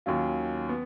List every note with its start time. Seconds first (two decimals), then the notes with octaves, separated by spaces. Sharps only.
0.06 D#2 D#3 F#3 C#4 F4
0.69 B3